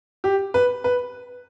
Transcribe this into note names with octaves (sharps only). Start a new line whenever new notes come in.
G4
B4
B4